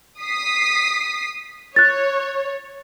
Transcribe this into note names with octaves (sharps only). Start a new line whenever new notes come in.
D#6 B6 C7
C#5 F#6 A6